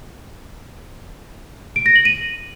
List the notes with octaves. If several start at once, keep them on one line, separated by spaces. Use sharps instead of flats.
D7
A#6
F#7
D#7